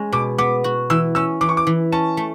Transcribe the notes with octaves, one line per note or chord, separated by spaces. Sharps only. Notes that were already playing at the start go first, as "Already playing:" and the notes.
Already playing: G#3 C#4
B2 D6
B3 D6
F#4
E3 E6
C#4 E6
E3 D6
C#6
D6
E3
C#4 A5
A3